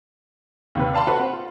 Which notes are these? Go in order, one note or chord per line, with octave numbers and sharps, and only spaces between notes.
D#2 C3 B4
D5 F5 A5 B5 C6
F#4 A4 B4 F#5
C4
F4